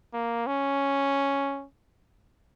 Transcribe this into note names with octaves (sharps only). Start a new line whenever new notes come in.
A#3
C#4